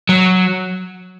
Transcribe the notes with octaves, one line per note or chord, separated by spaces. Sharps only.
F#3